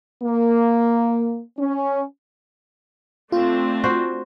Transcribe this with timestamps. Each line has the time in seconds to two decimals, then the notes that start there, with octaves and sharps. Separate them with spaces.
0.23 A#3
1.58 C#4
3.32 A3 C4 D4 F4
3.84 F#4 C5